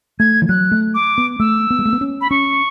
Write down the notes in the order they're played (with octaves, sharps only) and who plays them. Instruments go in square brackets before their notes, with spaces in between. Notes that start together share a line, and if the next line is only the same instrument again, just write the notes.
[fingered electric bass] A3 [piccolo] G#6
[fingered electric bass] E3
[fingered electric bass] F#3 [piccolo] F#6
[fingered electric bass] A3
[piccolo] D6
[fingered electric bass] B3
[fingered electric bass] A3 [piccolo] E6
[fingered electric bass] B3
G#3
A3
B3
C#4
[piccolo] B5
[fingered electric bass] C#4 [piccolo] C#6